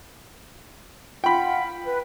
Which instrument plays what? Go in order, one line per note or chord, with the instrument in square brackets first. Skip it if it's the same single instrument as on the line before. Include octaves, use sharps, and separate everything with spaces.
[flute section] F4 F#5 [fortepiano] G5 B5
[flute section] B4